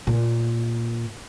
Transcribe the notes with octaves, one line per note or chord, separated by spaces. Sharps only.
A#2